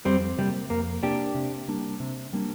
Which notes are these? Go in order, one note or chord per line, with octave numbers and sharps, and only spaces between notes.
F2 G3 C4
C3 G3 A#3
F2 A#3
C3 A#3 D4 G4
C3
G3 A#3 D4
C3
G3 A#3 D4